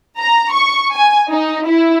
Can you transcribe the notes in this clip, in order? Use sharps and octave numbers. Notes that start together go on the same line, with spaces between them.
A#5
C#6
G#5
D#4
E4